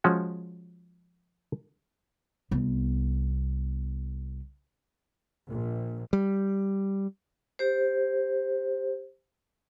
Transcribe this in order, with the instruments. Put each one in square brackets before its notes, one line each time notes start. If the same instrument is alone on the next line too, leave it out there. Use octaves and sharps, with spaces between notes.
[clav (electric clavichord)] F3 G#3 C#4 F#4
[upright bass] C2 B3
[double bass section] A#1
[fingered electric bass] G3
[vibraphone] G4 C5